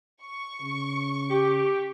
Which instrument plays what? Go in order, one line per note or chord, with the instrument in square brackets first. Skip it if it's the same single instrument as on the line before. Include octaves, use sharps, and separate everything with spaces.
[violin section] C#6
[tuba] C#3
[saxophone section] G4